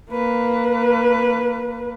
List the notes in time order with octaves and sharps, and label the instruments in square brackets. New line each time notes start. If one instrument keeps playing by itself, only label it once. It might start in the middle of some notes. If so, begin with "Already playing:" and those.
[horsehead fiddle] A#3 B4